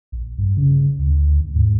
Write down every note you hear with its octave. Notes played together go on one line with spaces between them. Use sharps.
A#1
G2
C#3
D2
D#2
G#2